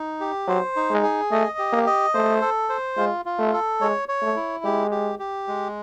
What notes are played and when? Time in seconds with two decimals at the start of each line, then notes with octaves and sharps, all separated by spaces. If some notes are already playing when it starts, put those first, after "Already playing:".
Already playing: D#4
0.20 G4
0.47 F#3 C5
0.76 D#4
0.90 G#3
1.03 G#4
1.31 A3 D#5
1.58 G4
1.72 A#3
1.86 D#5
2.14 A3 C5
2.41 A4
2.69 C5
2.97 G#3 F4
3.25 F4
3.39 A3
3.53 A4
3.81 G#3 C#5
4.09 C#5
4.22 A3
4.36 E4
4.64 G#3 G4
4.91 G4
5.19 G4
5.48 G#3